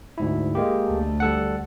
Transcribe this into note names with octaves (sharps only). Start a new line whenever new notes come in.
D2 G#2 E4
G#3 A#3 G4
D2 A3
G3 A4 F#5